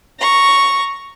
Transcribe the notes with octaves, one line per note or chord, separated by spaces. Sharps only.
A#5 C#6